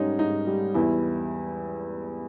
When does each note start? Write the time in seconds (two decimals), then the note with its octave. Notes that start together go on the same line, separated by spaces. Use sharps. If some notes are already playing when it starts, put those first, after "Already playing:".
Already playing: G#2 G3 C#4 D#4
0.19 G#2 D#4
0.47 G3
0.74 E2 E4